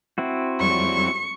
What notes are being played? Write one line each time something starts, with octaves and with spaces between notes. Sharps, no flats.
C4 E4 F#4
F2 F#3 G3 C#6